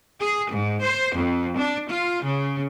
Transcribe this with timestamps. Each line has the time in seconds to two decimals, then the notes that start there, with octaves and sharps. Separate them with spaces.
0.20 G#4
0.51 G#2
0.81 C5
1.15 F2
1.56 D4
1.88 F4
2.23 C#3